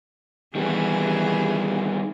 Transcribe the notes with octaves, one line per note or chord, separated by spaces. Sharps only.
D#3 E3 G3 B3 G#4